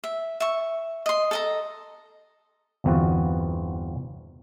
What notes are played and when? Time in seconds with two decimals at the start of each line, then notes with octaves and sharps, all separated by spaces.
0.04 E5
0.40 E5 C#6
1.06 D#5 C6
1.31 A4 D#5 A#5
2.84 G1 E2 B3 C4 F4 F#4